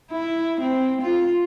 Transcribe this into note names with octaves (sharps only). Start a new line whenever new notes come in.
E4
C4
F4